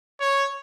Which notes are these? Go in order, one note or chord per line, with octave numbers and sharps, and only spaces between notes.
C#5